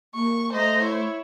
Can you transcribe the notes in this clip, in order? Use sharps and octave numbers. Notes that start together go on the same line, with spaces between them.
A#3 C#6
A3 C5 D#5 A#5
E4 C#5